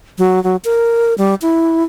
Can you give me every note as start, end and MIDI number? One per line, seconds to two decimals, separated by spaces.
0.18 0.42 54
0.44 0.56 54
0.65 1.14 70
1.18 1.35 55
1.42 1.83 64